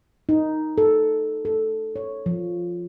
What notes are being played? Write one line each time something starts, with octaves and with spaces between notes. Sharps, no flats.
D#4
A4
A4
C#5
F3